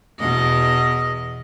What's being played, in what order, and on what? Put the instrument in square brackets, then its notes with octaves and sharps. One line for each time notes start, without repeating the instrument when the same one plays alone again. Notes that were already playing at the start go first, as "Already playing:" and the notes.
[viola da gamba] E2 B2 D#5